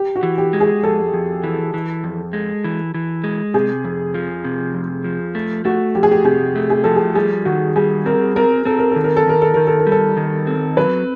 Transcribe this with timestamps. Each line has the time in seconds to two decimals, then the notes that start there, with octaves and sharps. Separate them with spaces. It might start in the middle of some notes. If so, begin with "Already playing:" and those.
Already playing: G4
0.16 F#4
0.23 E3
0.38 G4
0.53 G#3
0.60 G#4
0.83 F2 A4
1.13 F2
1.43 E3
1.74 E3
2.04 F2
2.33 G#3
2.64 E3
2.94 E3
3.24 G#3
3.54 C3 G#4
3.84 F2
4.14 F3
4.45 C3
4.74 F2
5.04 F3
5.35 A3
5.65 A3 F#4
5.95 F2 G4
6.03 G#4
6.11 G4
6.25 C3 G#4
6.55 A3
6.70 G#4
6.84 F3 A4
6.96 G#4
7.15 G3 G#4
7.45 D#3 F#4
7.76 G3 G#4
8.05 C4 A#4
8.36 C4 A#4
8.65 C4 A4
8.79 A#4
8.91 D#3 A4
9.04 A#4
9.16 A4
9.27 D#3 A#4
9.42 A4
9.54 D#3 A#4
9.67 A4
9.80 A#4
9.87 G3
9.92 A4
10.17 D#3
10.47 C4
10.77 F#3 B4